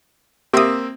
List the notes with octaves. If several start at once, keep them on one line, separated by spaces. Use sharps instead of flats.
A#3 C4 G4 E5 D#6